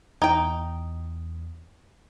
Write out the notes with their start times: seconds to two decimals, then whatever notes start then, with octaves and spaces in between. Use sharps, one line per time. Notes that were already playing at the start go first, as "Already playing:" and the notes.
0.22 E2 D#4 G5